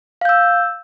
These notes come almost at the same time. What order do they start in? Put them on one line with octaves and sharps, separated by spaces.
F5 G6 E6